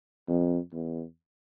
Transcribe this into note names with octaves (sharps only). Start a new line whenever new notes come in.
F2
E2